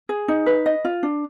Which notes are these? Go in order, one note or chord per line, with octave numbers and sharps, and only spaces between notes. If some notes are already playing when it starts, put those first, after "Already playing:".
G#4
D#4
B4
D#5
F4
D4